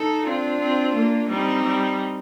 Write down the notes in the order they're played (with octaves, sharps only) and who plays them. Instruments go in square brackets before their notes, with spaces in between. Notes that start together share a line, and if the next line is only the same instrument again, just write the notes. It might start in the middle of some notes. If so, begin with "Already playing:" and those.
Already playing: [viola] D#4 [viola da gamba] A4
[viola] C4 [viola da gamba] D4 F4
[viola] C4
A#3
[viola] G3 [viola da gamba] C4 D#4
[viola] G3